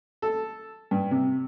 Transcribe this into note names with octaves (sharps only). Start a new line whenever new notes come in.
A4
G2
C3